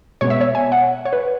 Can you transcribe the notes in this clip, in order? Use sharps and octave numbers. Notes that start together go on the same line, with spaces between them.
B2 G#3 B3 C#5
E5
C#5
G#5
F#5
C#5
B4